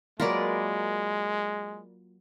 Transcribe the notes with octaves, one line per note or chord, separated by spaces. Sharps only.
F#3 G#3 A#3 F4 A#4 B4 D5